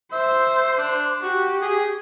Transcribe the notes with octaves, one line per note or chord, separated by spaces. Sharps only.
C5 E5
D4
F#4 G4
G#4